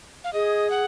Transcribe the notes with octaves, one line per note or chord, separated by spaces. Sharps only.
F5
G#4 D#5
F#5